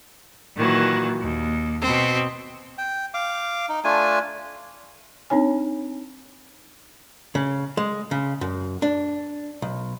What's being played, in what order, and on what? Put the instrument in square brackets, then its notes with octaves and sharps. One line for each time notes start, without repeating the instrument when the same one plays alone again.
[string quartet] A#2 D#3 E3 F#3
D#2
B2 C4
[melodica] G5
F5 D6
D#4
A3 D4 F4 G#5
[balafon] C4 D4 D#4 C#5 G#5
[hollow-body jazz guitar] C#3
G#3
C#3
F#2
D4
B1